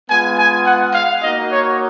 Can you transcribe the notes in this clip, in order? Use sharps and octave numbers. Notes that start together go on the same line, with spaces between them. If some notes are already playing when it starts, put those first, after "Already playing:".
G#3 B3 F4 G#5
G#5
F#5
F5
A#3 D#4 F#4 D#5
C#5